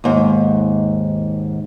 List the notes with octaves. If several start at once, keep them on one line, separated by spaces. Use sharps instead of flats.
D#2 G#2